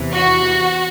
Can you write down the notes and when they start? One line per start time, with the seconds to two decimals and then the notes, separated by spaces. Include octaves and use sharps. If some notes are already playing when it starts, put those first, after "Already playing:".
Already playing: E2 C3 E3
0.14 F#4